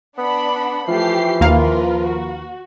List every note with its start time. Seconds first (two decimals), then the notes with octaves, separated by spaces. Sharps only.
0.18 B3 D4 F#5 B5
0.88 E3 F3 A3 G4 C7
1.41 D#2 A#3 F4 A#4 B4 F5
2.07 F#4